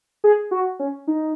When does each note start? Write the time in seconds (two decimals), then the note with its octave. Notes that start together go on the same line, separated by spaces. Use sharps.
0.24 G#4
0.51 F#4
0.80 C#4
1.07 D#4